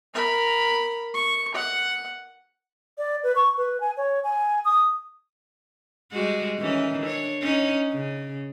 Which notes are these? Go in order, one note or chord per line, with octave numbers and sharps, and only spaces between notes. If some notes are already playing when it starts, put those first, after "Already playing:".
A#4 B5
C#6
F#5
D5
B4
C#6
B4
G#5
C#5
G#5
D#6
G3 G#3 F#4
D#3 E3 C#4
D4 C#5
C#4 D#4
C#3